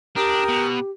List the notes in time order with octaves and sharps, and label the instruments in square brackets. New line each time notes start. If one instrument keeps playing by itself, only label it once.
[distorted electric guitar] D4 [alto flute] G4 [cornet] A#4 [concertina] G5 D#6
[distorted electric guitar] B2